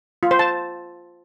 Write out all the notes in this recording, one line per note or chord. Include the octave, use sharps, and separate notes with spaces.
F4
C5
A5